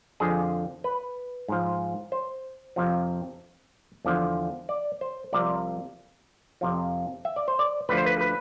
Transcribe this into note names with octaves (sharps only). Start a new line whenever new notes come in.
F2 D3 F3 G#4
B4
G#2 F3
C5
F2 C3 F3
E2 D3 F3
D5
C5
C2 C3 F3 D5
F2 C3 F3
E5
D5
C5
D5
D2 D3 F3 B4
C5
B4
B4